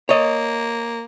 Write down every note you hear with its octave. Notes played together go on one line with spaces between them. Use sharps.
A#3 C#5 D#5